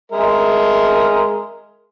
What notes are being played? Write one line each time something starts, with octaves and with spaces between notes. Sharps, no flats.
G#3 A#4 E5